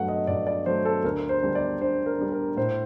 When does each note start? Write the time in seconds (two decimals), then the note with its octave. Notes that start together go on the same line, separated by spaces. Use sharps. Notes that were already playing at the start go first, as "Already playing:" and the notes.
Already playing: G2 F#3 A3 F#5
0.08 D#5
0.27 G2 D5
0.47 D5
0.66 F#3 A3 C5
0.85 A4
1.04 D2 A#4
1.29 C5
1.43 D3 G3 D4
1.55 D5
1.81 D2 C5
2.06 A#4
2.19 D3 G3 D4
2.32 A#4
2.57 A2 C5